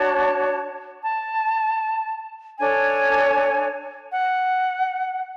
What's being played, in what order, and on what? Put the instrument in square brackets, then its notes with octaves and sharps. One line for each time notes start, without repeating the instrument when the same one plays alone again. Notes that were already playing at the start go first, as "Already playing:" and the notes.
Already playing: [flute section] D4 F#4 C#5 A5
A5
D4 A4 C#5 G#5
F#5